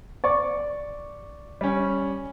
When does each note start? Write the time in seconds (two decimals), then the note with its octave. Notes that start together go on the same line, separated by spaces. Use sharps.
0.24 D5 C#6
1.61 G3 C#4